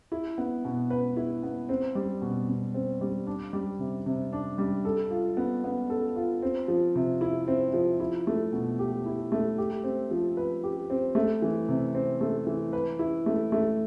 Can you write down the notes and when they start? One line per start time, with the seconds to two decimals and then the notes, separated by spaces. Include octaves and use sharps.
0.12 E4
0.38 B3
0.65 B2
0.90 B4
1.17 E4
1.43 B3
1.69 C4
1.95 G3
2.22 B2
2.49 B2
2.74 C4
3.01 G3
3.27 D4
3.53 G3
3.79 C3
4.06 C3
4.33 D4
4.58 G3
4.85 A4
5.11 F4
5.37 B3
5.64 B3
5.90 A4
6.16 F4
6.42 C4
6.68 F3
6.96 C3
7.21 E4
7.48 C4
7.73 F3
8.00 E4
8.27 A3
8.53 B2
8.79 G4
9.06 E4
9.32 A3
9.58 G4
9.84 C4
10.11 F3
10.37 B4
10.63 G4
10.90 C4
11.15 A3
11.42 E3
11.69 C3
11.95 C4
12.21 A3
12.47 E3
12.73 B4
12.99 E4
13.26 A3
13.52 A3